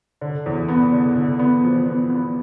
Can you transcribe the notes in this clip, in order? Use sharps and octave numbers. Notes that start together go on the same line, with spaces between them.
D3
E2
B3
D3
D3
B3
F3
B3
B3